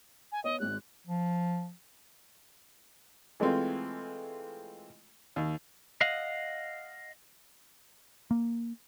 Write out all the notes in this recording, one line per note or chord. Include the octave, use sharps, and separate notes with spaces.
G#5
B3 C#5 D#5
G#1 G#3 F#6
F3
E3 G#3 A3 C4 F4
D#2
D#5 F5 F#5
A#3